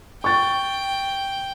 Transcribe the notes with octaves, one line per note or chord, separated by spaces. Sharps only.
G5 C#6 A6